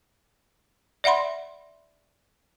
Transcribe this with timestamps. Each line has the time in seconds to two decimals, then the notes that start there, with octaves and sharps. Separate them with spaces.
1.04 D5 E5 F#5 B5 C6